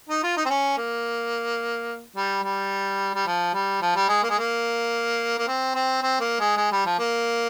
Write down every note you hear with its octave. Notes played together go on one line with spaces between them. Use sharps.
D#4
F4
D#4
C4
C#4
A#3
G3
G3
G3
F3
G3
F3
G3
G#3
A#3
G#3
A#3
A#3
C4
C4
C4
A#3
G#3
G#3
G3
F3
A#3